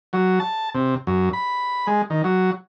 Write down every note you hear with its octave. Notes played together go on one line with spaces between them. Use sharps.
F#3
A5
C3
F#2
B5
G#3
D#3
F#3